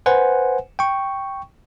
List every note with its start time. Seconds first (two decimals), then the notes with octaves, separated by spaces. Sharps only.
0.06 B4 C5 F#5 G#5
0.79 G5 C#6